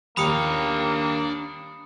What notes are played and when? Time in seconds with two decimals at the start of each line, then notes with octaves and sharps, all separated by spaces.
0.17 D#2 G3 A#3 D4 A#5 B5 D#6 C#7